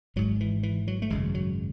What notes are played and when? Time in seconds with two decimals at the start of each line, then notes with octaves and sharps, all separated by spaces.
0.16 G#1 G#2 F#3
0.40 E3
0.63 E3
0.88 F#3
1.02 A3
1.10 G#1 F#2 C#3 G#3
1.35 F#3